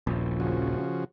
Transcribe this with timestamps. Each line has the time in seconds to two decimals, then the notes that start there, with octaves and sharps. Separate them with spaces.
0.07 D#1 A#1
0.40 C#3 F3 F#4